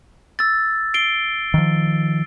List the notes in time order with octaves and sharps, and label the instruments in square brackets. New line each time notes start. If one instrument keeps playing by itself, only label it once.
[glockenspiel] E6 A6
C7 D7 G7
[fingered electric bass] D#3 F3